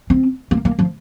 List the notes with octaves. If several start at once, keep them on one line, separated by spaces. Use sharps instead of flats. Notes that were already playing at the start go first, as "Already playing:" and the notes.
C4
A#3
A#3
F3